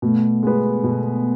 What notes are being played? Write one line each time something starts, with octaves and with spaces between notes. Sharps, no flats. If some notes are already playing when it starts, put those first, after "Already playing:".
B2 A3
G#3 B3
B2